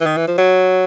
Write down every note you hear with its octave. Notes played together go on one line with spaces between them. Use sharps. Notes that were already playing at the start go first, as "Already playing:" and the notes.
E3
D#3
E3
F3
F#3